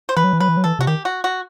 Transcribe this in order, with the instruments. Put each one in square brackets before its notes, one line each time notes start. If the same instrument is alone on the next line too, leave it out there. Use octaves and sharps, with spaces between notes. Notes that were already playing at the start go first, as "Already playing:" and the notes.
[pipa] C5
[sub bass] E3 [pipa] B4
[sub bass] F#3
E3
[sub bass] F#3 [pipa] B4
[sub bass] E3
F#3
[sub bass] E3 [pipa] A4
[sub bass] C3 [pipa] F#4
[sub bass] D#3 [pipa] G4
[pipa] F#4
F#4